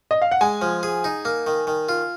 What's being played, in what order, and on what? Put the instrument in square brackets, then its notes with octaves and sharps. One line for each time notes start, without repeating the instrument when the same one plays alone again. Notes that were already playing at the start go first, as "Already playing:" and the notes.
[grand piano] D#5
F5
F#5
[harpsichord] G#3 [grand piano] G#5
[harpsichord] F3
G#4
D#4
A#3
D#3
D#3
F4